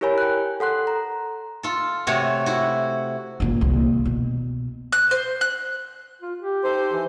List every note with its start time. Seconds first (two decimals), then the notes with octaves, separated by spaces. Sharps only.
0.01 E4 G4 A#4 C#5 G#5 B5
0.18 G5 F#6
0.60 A4 F#5 C6 F#6
0.87 A#5
1.63 F4 A4
2.07 C3 A3 F#4 C#5
2.46 E4 F#4
3.40 F#2 A#2
3.61 C2 A#3
4.05 B2
4.93 F#6
5.11 C5
5.41 F#6
6.22 F4
6.41 G4
6.64 D#4 A4 C5
6.93 E3